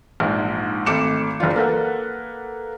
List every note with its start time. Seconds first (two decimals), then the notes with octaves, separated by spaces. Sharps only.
0.20 A#1 G#2
0.86 G#1 A3 D6 C#7 E7
1.40 F#1 D4 F4
1.56 A#3 A4 B4 F#5